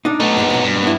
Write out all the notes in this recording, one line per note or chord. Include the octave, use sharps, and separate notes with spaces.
D4 D#4
A3 B3 D#4
G2 A#2 G#3
B1 F#2
G2
B3 E4